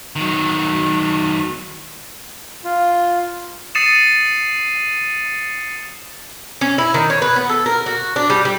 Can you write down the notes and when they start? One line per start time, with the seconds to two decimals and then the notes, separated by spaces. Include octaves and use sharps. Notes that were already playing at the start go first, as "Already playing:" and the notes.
0.16 D#3 F#3
2.64 F4
3.75 D#6 A6 C7 C#7 D#7 E7
6.61 C#4
6.78 E4
6.94 D#3
7.10 C#5
7.22 B4
7.36 B3
7.49 A4
7.66 A#4
7.86 F#4
8.16 D4
8.30 G3
8.45 G3